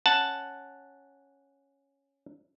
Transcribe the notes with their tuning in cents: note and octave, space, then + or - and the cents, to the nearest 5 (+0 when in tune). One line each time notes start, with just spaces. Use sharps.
C#4 +0 F#5 +0 A5 +0